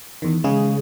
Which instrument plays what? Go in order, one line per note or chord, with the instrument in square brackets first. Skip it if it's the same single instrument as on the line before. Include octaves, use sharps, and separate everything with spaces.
[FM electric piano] E2 D#3
[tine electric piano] C#3 [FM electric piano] G#3 G#4